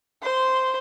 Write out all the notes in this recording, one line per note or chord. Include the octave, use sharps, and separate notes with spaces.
C5 C6